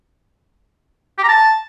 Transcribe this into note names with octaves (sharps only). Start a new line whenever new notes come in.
G4
A#5
A5